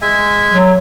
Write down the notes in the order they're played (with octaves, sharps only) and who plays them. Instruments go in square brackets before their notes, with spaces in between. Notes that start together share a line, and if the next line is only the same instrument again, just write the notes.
[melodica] G#3 E5 G#5
[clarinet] F#3